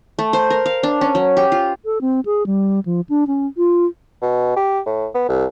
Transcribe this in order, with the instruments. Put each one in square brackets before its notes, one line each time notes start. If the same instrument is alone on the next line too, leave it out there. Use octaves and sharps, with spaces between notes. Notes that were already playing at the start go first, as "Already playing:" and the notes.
[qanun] A3
C5
A#4
F5
D4
C#4
F#3
G4
F4
[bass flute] A4
C4
G#4
G3
F3
D4
C#4
F4
[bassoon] B2
G4
A2
B3
C2